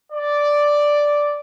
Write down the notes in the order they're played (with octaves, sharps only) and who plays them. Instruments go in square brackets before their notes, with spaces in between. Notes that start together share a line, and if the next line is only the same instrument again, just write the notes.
[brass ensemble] D5